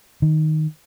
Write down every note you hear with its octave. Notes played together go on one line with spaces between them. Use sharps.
D#3